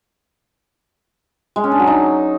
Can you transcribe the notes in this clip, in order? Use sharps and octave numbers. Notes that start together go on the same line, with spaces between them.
G#3
C#4
D4
F#3
D#4